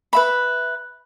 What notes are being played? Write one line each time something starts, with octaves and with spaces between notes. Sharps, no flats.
B4 E5 B5